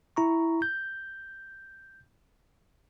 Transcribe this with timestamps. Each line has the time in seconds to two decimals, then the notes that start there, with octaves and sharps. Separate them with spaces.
0.16 E4 A#5 C#6
0.62 G6